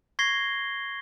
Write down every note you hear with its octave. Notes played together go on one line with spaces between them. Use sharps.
C#6 G#6 A#6 C7 G7